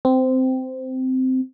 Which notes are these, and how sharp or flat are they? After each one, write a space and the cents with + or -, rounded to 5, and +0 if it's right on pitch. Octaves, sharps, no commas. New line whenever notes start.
C4 -15